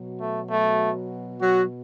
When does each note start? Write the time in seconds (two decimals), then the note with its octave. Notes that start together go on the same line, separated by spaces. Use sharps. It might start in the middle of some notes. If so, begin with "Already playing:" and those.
Already playing: B2 F#3
0.20 A3
0.50 A3
1.41 F#3 F#4